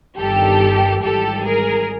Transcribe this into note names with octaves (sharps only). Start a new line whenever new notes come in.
G1 G2 D#3 G3 G4 A4
G#1 G#2 E3 G3 G4 A4
G#4 A#4